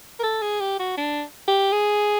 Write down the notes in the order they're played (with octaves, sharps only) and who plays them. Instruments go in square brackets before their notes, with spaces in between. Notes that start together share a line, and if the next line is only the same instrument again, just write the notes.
[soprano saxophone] A#4
A4
G#4
G4
F#4
D4
G4
G#4